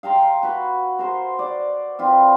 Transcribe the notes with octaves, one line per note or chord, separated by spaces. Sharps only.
F5 G5 A#5 C6
F#4 B4
A#4 C5 C6
D5
C4 F4 B4 D5